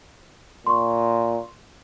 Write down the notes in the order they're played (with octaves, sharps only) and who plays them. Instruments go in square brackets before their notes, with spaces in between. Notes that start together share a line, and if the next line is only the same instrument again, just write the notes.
[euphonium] A#2 [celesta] C6 C#6